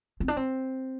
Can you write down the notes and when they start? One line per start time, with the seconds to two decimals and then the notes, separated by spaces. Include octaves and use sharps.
0.20 C4
0.28 D4
0.37 C4